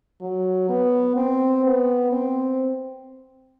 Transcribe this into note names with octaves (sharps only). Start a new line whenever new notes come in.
F#3
B3
C4
B3
C4